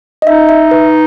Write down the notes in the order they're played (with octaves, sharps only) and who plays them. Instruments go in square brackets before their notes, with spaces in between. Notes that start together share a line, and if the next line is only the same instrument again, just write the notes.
[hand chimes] D#5
[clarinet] D#4 [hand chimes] E5
[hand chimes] E5
B4